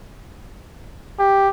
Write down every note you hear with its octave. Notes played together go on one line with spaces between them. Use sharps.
G4